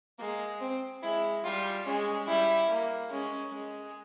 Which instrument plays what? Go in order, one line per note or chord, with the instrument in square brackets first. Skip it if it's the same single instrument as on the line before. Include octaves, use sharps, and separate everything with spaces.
[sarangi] G#3 [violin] A#3
[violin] C4
[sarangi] G#3 [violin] E4
[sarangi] G3 [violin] F4
[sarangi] G#3 [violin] C#4
[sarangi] G3 [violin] E4
[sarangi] A#3
[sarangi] G#3 [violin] C#4
[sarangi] G#3